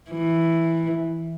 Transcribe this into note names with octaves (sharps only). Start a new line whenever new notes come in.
E3